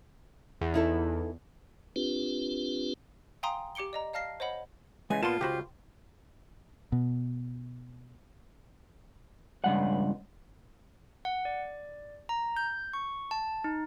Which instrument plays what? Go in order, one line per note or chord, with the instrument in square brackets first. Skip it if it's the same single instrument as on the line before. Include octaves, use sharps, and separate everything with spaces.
[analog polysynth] E2
[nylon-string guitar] D#4 E4 A4
[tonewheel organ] C4 D4 F4 G4 B4
[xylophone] F5 G5 G#5 A#5 C6 D#6
G4 D6 C#7 D7 G7
D5 D#5 A#5
D5 F5 A5 F6 A#6 C7
C5 C#5 D#5 F#5 B5
[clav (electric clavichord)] C#3 E3 [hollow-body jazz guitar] G#3 [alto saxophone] G#5
[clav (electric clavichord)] A#2 B3 [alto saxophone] F4 [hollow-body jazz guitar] A5 C6
[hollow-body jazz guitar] C#2 F#4 B5 [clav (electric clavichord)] G4 C5
[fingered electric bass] B2
[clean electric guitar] C#2 G2 F#5
[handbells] F#5
D5
A#5
G6
C#6
A5
D#4